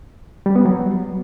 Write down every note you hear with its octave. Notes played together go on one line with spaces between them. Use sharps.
G3
B3
F#3